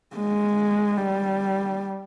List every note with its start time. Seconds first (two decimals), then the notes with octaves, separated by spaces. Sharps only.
0.16 G#3
0.97 G3